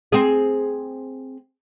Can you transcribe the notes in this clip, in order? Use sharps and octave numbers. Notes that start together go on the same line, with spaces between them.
C4 G#4